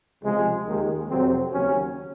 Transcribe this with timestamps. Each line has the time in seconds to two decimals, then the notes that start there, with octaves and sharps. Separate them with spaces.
0.22 C#2 C3 F3 G#3
0.66 D#2 D#3 G#3
1.09 F2 C3 F#3 C4
1.52 D#2 C#3 F#3 C#4